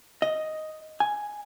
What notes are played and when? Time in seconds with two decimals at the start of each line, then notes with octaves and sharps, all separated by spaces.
0.22 D#5
1.00 G#5